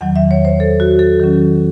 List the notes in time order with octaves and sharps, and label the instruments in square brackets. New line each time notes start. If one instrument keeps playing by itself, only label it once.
[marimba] E2 D#3 F#3 F#5
E5
C#5
C5
A4
F#4
A4
D#3 F#3 C#4